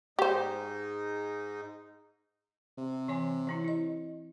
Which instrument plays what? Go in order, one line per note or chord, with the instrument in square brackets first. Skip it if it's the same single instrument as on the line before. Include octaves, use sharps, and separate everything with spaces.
[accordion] G#2 D#4 [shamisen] G4 C5
[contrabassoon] C3
[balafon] E3 C#5 G#5
E3 C4 E4
E4 D#5